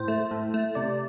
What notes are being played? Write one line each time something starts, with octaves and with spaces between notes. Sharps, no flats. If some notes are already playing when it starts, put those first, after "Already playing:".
Already playing: A2 C5
A3
A2
A3
C3 D5